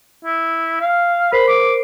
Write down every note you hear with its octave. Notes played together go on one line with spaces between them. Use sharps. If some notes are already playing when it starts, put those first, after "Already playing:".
E4
F5
A#4 C5 B5 C7
D6